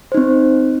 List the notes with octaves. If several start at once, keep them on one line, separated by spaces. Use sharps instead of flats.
C4 D#4 C5